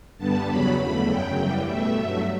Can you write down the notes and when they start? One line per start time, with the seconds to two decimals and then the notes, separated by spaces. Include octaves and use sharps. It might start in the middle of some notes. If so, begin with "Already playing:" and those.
0.17 G2 D3 G3 B3 A5
0.47 E2 C#3 F#3 B5
0.77 E2 D3 A3 B5
1.06 F#2 C#3 F#3 G5
1.36 F#2 E3 G3
1.65 B2 A3 E5
1.95 G2 F#3 A3